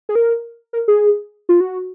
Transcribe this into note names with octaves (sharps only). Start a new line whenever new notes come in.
G#4
A#4
A#4
G#4
F4
F#4